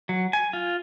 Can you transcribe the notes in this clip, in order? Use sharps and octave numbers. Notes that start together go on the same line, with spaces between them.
F#3
G#5
F4